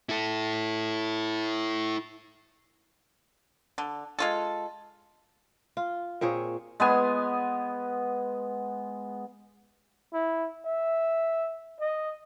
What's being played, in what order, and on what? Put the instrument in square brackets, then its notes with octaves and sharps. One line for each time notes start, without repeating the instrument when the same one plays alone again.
[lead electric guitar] E4 A4
[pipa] D3
G#3 F4 A4
[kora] F4
A#2 C4 G#4 C#5
[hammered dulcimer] G#3 B3 G#5
[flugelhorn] E4
E5
D#5